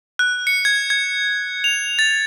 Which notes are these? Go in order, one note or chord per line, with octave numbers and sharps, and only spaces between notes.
F#6
C#7
G#6
G#6
F7
A6